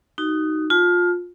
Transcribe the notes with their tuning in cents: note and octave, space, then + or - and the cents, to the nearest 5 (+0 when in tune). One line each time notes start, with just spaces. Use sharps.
D#4 +0 F#4 +30
F4 +20 A5 -15